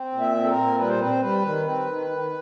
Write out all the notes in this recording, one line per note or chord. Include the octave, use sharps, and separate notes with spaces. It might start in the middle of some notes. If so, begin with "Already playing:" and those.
Already playing: C4
A#2
E5
C4
A4
A#4
A#2
G3 B4
C5
C4 B4
C5
G3 B4
D#3
C4 B4
D#3
D#3